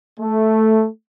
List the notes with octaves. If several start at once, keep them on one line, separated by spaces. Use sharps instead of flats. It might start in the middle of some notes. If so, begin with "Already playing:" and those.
A3